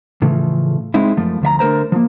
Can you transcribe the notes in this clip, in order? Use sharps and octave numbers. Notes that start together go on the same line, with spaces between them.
A2 C#3 E3 F3 A3
G#3 C4 D#4 E4
F#2 F3 A3
D2 F3 E5 A#5
D3 A3 A#4 C5 A#5
F3 A#3